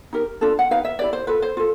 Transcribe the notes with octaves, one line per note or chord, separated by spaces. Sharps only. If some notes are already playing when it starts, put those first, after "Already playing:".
D#4 G4 A#4
D4 F4 A4
F#5
D#4 G4 B4 F5
E5
E4 G4 B4 D5
C5
F4 A4 B4
C5
F4 A4